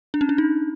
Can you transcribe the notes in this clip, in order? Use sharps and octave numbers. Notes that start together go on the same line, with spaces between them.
D4
C#4
D4
D#4